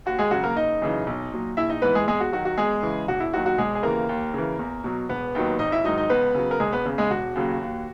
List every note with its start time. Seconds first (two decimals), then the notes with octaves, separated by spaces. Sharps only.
0.06 D#2 F#4
0.19 G#3 G#4
0.31 C#3 F#3 F#4
0.43 A#3 A#4
0.56 F#1 D#4 D#5
0.82 F#2 C#3 E3
1.07 B1
1.32 A#2 F#3
1.57 A#1 E4 E5
1.70 D#4 D#5
1.82 G#2 E3 B3 B4
1.95 G#3 G#4
2.08 E2 G#3 G#4
2.20 F#4
2.32 D#3 F#3 F#4
2.45 F#4
2.58 E2 G#3 G#4
2.83 C#3 E3
3.08 E1 F#4
3.20 E4
3.33 D#2 D#3 F#3 F#4
3.46 F#4
3.58 E1 G#3 G#4
3.75 G#4
3.83 D#2 C#3 E3 A#3 A#4
4.09 D#2
4.34 C#3 E3
4.59 E2
4.84 B2 F#3
5.09 E1 B3 B4
5.35 D#2 D#3 F#3
5.59 G#1 D#4 D#5
5.72 E4 E5
5.84 G#2 D#3 F#3 D#4 D#5
5.98 D#4 D#5
6.10 C#2 B3 B4
6.35 C#3 F#3
6.51 A#4
6.60 E1 G#3 G#4
6.72 B3 B4
6.85 E2 C#3
6.98 G#3 G#4
7.11 E1 F#4
7.35 D#2 C#3 F#3
7.61 D#2